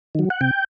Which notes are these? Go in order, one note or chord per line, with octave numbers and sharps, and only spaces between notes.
D#3 F#3
F#5
C3 G5